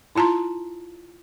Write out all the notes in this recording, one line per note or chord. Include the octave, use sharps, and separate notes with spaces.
E4 F4 A5 A#5 C6